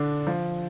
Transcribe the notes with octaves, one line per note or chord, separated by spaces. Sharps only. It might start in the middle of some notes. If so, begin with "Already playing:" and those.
Already playing: D3 D4
F3